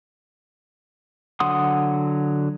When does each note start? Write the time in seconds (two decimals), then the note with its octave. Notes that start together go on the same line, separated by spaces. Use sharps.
1.40 D3 F#3 F#5 C6 D#6